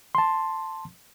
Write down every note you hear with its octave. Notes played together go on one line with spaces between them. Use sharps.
A5 C6